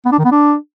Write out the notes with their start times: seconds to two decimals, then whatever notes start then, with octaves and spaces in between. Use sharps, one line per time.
0.06 B3
0.12 D4
0.18 D#3
0.25 B3
0.31 D4